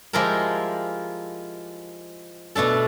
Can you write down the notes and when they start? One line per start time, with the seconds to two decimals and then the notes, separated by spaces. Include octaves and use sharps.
0.13 F3 G#3 E4 G4 A#4
2.55 B2 A3 D4 A4